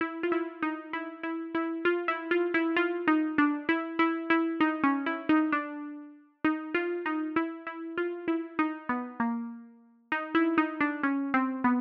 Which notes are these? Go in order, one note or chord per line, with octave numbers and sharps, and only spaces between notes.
E4
F4
E4
D#4
E4
E4
E4
F4
E4
F4
E4
F4
D#4
D4
E4
E4
E4
D#4
C#4
E4
D#4
D4
D#4
F4
D#4
E4
E4
F4
E4
D#4
B3
A#3
D#4
E4
D#4
D4
C#4
C4
B3